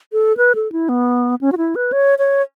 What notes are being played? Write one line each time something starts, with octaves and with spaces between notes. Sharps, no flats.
A4
B4
A4
E4
B3
C#4
F#4
E4
B4
C#5
C#5